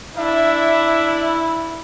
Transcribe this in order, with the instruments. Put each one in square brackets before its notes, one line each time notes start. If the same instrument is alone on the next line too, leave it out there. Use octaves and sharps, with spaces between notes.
[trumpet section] D4 E5 [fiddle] E4